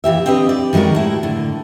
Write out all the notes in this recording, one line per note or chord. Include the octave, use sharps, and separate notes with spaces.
A#2 E3 G4 E5
C4 D4 G4 B4 D#5
D5
D#3 G3 G#3 F#4 A#4
A2 E4
A2 D3